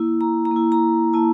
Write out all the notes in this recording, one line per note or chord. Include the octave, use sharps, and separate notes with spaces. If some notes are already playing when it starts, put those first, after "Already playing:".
Already playing: A#3 E4
A#5
A#5
A#3
E4
A#5
A#3 E4 A5